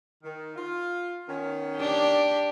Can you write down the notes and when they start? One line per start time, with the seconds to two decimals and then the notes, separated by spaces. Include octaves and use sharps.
0.24 D#3
0.56 F4
1.28 D#3 B3 C#4
1.78 D4 G4